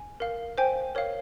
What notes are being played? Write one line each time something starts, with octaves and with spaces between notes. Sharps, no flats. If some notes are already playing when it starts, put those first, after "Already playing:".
Already playing: G#5
A#4 F5
C5 G5 G#5
A#4 C#5 F5